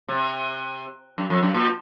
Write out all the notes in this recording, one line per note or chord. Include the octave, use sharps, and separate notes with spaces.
C3
F#2
F2
F#2
A#2